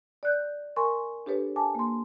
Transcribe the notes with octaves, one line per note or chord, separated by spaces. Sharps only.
D5 F#6 G6
A#4 G#5 C6 C#6
D4 G4 A4 B4 C#5
G#5 A5 D6
A#3 C6